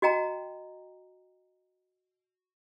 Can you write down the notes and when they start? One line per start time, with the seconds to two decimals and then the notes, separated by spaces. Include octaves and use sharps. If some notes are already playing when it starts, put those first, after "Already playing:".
0.02 F#4 D#5 G5 A#5